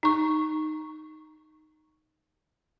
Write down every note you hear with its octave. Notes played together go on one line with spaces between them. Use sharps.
D#4 C#6